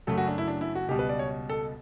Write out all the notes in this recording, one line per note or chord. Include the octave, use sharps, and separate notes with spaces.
F#2 C#3 F#3 A3 A4
F#4
D4
E4
D4
E4
F#4
C#2 B2 G3 G4
B4
D5
C#5
A4